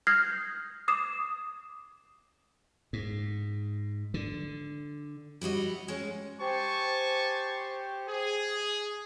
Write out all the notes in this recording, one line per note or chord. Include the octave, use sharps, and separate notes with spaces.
D#6 F6 G6 G#6 A#6 C7
D6 D#6 C7 E7
G#2
D3
G3 E4 F#4 D#5
G#3 C#4
G4 C5 G#5 A5 C#6
G#4